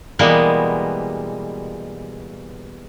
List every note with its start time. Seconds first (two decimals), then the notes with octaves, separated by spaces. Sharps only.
0.19 B2 E3 G3 G#3 A#3 B3